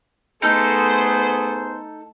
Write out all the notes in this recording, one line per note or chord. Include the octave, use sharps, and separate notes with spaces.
A3 B3 D#4 G#4 A4 C5